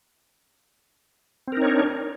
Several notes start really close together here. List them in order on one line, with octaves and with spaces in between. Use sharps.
C4 A#4 D#4 C#5 D4